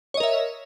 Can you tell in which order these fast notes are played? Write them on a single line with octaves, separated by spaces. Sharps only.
C#5 D#5 A#4 E5